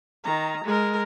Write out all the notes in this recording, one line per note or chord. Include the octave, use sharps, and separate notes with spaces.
D#3 A#5
G#3 A#4